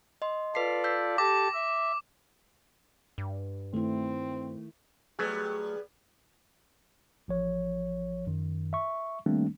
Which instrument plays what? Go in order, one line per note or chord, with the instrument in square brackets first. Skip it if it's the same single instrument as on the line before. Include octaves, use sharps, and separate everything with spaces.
[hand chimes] D#5 C6
[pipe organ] F4 A4 D5 [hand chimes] B4 B6 C7
[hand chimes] E6 G6 B6
[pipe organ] G4 A4 A5 [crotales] D6 [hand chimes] A#6
[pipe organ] E5
[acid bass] G2
[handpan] D#3 E4 [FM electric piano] A3 [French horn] C4
[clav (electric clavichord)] F#3 A3 [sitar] G3 B3 G#4
[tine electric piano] A1 F3 C#5
F#2 D#3
E5 C#6
D#3 G3 A3 A#3 C4 D4